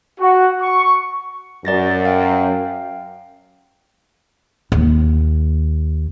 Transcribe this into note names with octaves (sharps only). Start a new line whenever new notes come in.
F#4
C#6
F#2 D5 A6 A#6
F5 G5
D#2